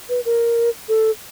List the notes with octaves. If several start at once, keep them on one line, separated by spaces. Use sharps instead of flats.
B4
A#4
A4